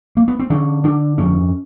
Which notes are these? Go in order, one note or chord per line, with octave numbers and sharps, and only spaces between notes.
A#3
B3
C4
D3 C#4
D3 D4
F2 C#4